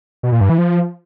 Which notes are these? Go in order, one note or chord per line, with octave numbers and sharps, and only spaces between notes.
B2
A#2
G2
E3
F3